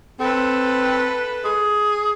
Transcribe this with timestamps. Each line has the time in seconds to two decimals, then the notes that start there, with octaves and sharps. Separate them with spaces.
0.20 C4 A4 B4
1.45 G#4